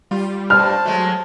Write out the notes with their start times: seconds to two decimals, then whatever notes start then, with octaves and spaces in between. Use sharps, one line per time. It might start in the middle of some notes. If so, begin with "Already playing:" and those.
0.11 G3 F4
0.50 G2 C5 A5 F6
0.85 F#3 G#3 A3